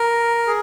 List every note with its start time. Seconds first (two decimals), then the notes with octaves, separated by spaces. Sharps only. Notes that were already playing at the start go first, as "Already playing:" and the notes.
Already playing: A#4
0.47 G#4